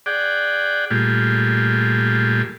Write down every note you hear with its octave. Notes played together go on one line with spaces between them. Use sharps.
G#4 D5 F#5 G5
A#2 G3 A3 F4 G4 G#4